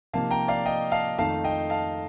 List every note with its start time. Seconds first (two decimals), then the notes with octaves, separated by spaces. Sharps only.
0.13 C3 F3 A#3 D#4 F5 A5
0.31 G5 A#5
0.48 D5 F5
0.65 D#5 G5
0.92 F5 A5
1.18 F2 D#3 A3 D#4 F5 A5
1.44 D#5 G5
1.70 F5 A5